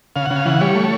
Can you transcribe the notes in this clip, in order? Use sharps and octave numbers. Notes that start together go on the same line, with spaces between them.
C#3 F5
F#5
C#3
F5
E3 F#5
G3 C#5
A3